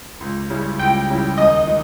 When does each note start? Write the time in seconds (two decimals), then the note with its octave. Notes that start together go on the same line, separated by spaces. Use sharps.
0.20 C#2
0.50 C#3 G3 C#4 E4
0.79 C#2 G5
1.09 C#3 G3 C#4 E4
1.38 D#2 D#5
1.67 D#3